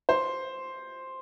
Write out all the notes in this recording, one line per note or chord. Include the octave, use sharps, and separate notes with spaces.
C5